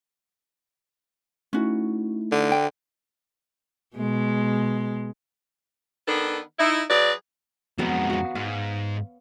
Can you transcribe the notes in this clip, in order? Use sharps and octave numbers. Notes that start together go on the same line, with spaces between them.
A3 C#4 D#4 E4 F#4
D3
G5
B2 G#3
D#3 B3 D4 A4 B4
D#4 E4
F#3 G#4 B4 D5
F2 F#3 G#3 B3 A#4
F#4 F5
G#2 F5